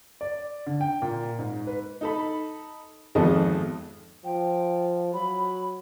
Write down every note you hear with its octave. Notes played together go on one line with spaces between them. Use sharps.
D5
D3
G5
A#2
G#2
B4
D#4 A4 B5
G#1 F2 B3 G#4 A4 D#5
F3 G5
F#3 B5